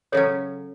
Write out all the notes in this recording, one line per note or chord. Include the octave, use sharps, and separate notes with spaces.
C#3 F#3 C#4 A4 C#5